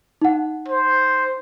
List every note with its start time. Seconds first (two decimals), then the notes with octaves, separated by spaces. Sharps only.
0.21 D#4 F#5
0.68 C5